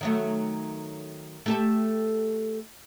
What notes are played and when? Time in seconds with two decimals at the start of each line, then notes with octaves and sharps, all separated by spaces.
0.01 D#3 F#3 A3
1.46 A3 G4 A4